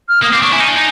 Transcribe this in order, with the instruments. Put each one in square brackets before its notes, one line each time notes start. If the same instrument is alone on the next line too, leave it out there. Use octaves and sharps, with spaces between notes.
[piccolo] F6
[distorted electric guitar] A#3 [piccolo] D#6
[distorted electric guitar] C4 [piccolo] D6
[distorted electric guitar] D4 [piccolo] C#6
[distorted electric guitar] E4 [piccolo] G#5
[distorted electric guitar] D#4
D4
D#4